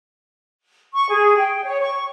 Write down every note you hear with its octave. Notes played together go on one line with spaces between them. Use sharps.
C#6
G#4
G5
C#5
C#6